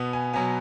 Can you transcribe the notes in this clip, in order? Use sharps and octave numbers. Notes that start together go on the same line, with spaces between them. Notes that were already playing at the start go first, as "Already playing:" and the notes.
Already playing: B2 B3
G#5
B2 F#3 B3 G#5